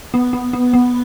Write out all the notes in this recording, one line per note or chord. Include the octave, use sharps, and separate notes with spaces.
B3
B3
B3
B3